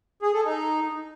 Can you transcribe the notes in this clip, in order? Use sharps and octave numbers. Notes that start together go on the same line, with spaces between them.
G#4
A4
D#4